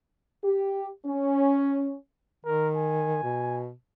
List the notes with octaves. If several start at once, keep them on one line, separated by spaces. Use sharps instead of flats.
G4
C#4
D#3 A#4
G#5
B2